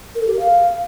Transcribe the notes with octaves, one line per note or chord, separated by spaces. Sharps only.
A#4
A4
G4
A#4
F5